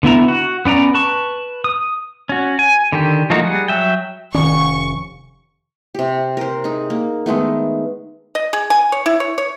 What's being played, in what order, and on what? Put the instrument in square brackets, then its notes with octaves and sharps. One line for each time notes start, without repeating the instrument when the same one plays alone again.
[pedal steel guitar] D3 B3 E4 A#5
F#4
B3 C#4 D5 A#5
B4 A5 C#6
D#6
C#4 F#4
G#5
D3 D#3 G4
F3 A3 A#3 D#4 F#4
G3 G#4 F#5
F#3 E5 G5
[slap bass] F1 C#4 [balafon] D#3 [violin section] C#6
[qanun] C3 G4
A#4 C5
D#4 G#4
A#3
D#3 G#3 A3 B3
[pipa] D#5
G#4
G#5
C#5
E4
C#5
C#5